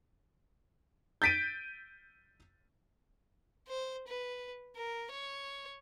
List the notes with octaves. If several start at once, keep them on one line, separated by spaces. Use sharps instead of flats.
G6 A6 B6 D7 D#7
C5
B4
A#4
C#5